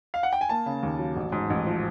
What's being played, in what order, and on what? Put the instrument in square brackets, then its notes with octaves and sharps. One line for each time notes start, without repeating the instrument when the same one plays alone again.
[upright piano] F5
F#5
G5
G#5
A#3 A5
C#3
D#2
F#3
A1
G#2
A1
F3